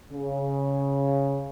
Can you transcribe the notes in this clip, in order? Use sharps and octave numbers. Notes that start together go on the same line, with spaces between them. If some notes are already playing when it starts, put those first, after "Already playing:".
C#3